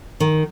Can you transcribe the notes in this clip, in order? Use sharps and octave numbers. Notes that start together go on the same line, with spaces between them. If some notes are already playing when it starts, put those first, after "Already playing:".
D#3